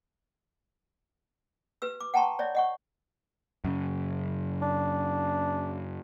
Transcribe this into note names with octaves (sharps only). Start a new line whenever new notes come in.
G4 B4 E6
D6
F#5 G5 A5 A#5 C6 C#6
C#5 D5 E5
D#5 F#5 C#6
F#2 C#3
D4